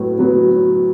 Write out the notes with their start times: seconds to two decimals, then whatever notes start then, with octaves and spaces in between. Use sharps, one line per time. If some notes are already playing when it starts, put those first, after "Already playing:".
Already playing: A2 F#3 B3
0.19 F#3 B3